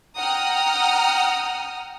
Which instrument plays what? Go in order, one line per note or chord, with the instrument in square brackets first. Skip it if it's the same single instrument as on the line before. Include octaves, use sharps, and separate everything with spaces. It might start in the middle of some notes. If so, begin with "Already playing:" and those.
[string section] F#5 G5 A#5 D#6 F6